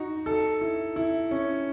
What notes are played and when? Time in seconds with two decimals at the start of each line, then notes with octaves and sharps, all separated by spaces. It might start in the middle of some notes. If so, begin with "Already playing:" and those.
Already playing: D#4 F#4
0.26 A4
0.61 E4
0.96 E4
1.31 C#4